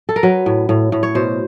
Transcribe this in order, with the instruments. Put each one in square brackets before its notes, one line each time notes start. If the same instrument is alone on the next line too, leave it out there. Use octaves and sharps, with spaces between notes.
[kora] A4
A#4
F#3 B4
A2
A2
A2
C#5
B2 C5